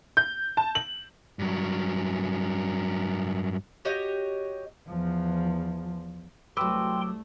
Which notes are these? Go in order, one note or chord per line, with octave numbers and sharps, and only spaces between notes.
G6
A5
F#7
G2 F#3
F#4 G4 C#5 D#5
E2 F3
C2 F#3 A3 B4 G5 C6 D6 E6